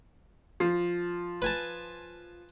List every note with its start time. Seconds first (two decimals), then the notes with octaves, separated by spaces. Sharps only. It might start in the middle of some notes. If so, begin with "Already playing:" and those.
0.60 F3
1.42 B4 G#5 A5